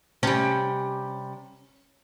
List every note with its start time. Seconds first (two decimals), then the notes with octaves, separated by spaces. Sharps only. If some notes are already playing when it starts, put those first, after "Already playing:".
0.23 C3 G3 C#4